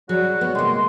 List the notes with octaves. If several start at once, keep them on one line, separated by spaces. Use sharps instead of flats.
C#3 F#3 G3 F#4
B3
C3 G#3 A#3 C6